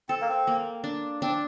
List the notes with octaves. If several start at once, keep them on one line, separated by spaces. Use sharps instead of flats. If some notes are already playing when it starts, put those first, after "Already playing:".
C4 A4
A#3
C4
A#3
D4
C4 D4